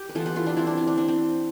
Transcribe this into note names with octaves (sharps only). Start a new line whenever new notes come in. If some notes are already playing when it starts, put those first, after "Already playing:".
Already playing: G4
B4
E3 B3 F4 A4
G4 B4
F4 A4
D4 F4
C4 E4
D4
C4
D4
D4
C4